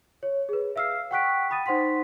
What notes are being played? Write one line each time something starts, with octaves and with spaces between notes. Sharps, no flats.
C#5
G#4 B4
E5 F5 E6 F6 C7
F#5 G5 C#6 F#6 B6 D7
G5 B5 D#6 A6 D#7
D#4 C5 F#5 C6 B6